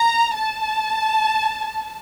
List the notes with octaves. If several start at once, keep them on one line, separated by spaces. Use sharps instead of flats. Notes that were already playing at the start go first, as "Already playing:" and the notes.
Already playing: A#5
A5